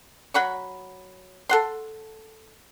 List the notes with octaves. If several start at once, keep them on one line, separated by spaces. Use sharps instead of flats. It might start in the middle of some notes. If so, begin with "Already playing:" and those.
F#3 F#5 B5 C#6
A4 F#5 C6